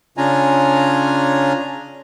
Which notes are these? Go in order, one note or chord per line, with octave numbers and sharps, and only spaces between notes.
C#3 C#4 D4 F4 G#5 A#5